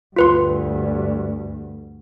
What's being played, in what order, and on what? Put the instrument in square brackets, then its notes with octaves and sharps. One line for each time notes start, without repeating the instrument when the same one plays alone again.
[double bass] D2 G2 [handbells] F4 B4 C6